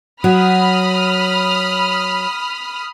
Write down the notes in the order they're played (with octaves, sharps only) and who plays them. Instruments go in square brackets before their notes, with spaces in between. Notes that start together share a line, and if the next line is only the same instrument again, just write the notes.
[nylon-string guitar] F#3 [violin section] B5 D#6 F6